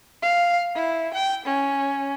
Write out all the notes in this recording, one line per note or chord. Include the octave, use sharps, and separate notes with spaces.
F5
E4
G5
C#4